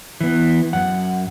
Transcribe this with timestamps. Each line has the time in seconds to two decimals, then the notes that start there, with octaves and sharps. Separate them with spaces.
0.21 E3 B3
0.73 F#2 F#5